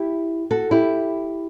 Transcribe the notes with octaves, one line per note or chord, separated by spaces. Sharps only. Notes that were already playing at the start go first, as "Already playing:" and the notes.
Already playing: E4 G4
F#4 A4
E4 G4